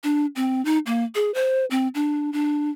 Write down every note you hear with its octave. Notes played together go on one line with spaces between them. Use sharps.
D4
C4
D#4
A#3
G#4
C5
C4
D4
D4